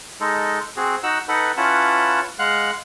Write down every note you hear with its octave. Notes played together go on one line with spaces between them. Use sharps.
G#3 D#4 A4
C4 F#4 G#4
D#4 F#4 F#5 E6
D#4 A4 B4 F#5
C#4 E4 F4 B4 F#5 A5
G#3 F5 F#5 F#6